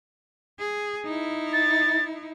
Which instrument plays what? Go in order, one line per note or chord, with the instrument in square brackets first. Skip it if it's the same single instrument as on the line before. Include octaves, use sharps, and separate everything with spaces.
[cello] G#4
D#4 E4
[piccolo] A6